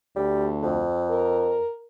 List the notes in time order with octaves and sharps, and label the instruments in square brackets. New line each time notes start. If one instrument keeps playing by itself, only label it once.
[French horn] D2 [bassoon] G3
[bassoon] F2
[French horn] A#4